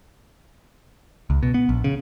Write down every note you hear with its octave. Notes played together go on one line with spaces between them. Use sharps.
C#2
B2
B3
A#1
C#3